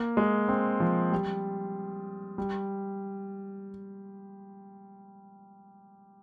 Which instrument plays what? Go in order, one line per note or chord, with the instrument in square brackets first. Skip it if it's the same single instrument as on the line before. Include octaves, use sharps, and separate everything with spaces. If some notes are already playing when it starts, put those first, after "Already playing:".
Already playing: [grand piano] A#3
G#3
C4
F3
G3
G3